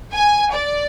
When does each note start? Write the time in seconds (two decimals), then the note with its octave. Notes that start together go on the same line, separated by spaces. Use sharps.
0.15 G#5
0.53 D5